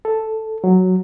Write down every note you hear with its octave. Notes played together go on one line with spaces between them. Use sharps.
A4
F#3